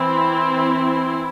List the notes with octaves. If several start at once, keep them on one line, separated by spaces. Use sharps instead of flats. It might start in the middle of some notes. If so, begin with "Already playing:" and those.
Already playing: E3 C4 E4